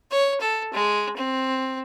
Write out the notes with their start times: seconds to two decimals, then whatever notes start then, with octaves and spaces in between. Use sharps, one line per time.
0.11 C#5
0.41 A4
0.74 G#3
1.17 C4